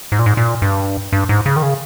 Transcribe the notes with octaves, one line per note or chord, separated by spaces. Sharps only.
G#2
A#2
G#2
A#2
G2
G2
G#2
C#3
D#3
C#3